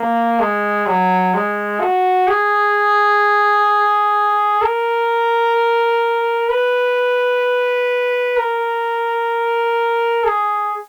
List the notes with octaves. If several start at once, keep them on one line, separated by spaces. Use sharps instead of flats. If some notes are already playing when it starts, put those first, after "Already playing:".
Already playing: A#3
G#3
F#3
G#3
F#4
G#4
A#4
B4
A#4
G#4